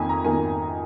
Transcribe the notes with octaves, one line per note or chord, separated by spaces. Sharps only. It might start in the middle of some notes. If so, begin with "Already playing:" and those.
Already playing: F2 D#3 A#3 G#5
A#5
F2 D#3 A#3 G#5